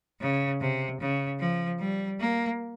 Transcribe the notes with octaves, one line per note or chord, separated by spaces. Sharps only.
C#3
C3
C#3
F3
G3
A#3